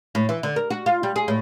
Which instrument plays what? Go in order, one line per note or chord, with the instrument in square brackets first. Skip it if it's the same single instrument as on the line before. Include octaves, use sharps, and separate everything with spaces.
[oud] A2
E3
D3
A#4
F#4
F4
G3
G#4
A2